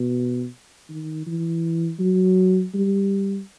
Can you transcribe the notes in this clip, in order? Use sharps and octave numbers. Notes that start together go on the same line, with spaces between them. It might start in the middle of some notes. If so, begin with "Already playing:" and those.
Already playing: B2
D#3
E3
F#3
G3